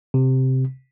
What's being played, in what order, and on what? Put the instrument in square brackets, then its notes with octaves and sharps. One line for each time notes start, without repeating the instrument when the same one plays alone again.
[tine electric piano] C3